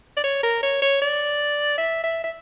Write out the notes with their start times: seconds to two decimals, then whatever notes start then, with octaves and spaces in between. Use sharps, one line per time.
0.16 D5
0.24 C#5
0.43 A#4
0.63 C#5
0.82 C#5
1.01 D5
1.77 E5
2.03 E5
2.24 E5